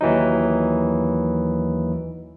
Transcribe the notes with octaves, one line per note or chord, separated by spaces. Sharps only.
D#2 E3 F#3 D#4